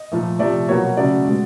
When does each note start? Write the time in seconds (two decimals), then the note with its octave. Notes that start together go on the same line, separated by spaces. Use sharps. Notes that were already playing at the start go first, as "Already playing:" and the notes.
Already playing: D#5
0.12 A#2 F3 A3
0.39 C3 F3 A3 D5
0.68 B2 F#3 A#3 C#5
0.97 C#3 F#3 A3 D5
1.26 B2 G#3